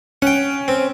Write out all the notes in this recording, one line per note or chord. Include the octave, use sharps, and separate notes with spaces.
C#4 F#5 G5
C4